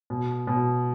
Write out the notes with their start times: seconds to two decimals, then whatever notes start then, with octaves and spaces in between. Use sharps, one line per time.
0.10 B2
0.47 B2